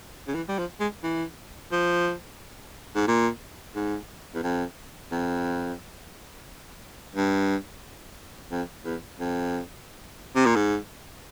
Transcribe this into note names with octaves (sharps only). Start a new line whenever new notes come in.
C#3
E3
G3
F3
G#3
E3
F3
G#2
A#2
G#2
E2
F2
F2
G2
F2
E2
F2
C3
A#2
G#2